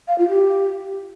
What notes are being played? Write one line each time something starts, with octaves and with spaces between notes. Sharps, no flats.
F5
F4
G4